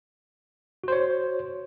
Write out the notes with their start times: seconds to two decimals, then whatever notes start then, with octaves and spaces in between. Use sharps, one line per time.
0.84 F#4
0.88 C5
0.92 C#5